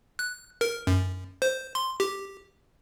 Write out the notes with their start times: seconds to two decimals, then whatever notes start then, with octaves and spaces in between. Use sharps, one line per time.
0.19 F#6
0.61 A#4
0.87 F#2
1.42 C5
1.75 C6
2.00 G4